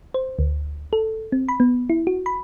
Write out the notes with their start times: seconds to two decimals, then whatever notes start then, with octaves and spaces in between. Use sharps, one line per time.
0.14 C5
0.39 D2
0.93 A4
1.32 C4
1.49 B5
1.60 B3
1.90 E4
2.07 F#4
2.26 B5